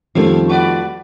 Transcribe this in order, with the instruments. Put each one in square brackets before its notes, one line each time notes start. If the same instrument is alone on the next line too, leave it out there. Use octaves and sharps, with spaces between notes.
[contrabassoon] F2 [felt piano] D#3 G3 A4 [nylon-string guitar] F3 A3 [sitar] B3
[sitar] F#4 B4 D5